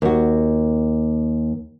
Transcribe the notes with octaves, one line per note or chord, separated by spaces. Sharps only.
D#2 F#4